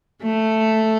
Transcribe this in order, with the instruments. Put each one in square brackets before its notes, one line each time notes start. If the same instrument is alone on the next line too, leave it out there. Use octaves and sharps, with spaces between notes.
[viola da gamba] A3